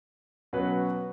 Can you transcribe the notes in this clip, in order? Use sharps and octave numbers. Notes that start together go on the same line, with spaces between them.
B2 F#3 C#4 F#4 B4